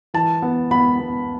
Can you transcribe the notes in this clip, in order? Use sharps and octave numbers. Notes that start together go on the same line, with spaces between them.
E3 A5
B3
B3 B5
B3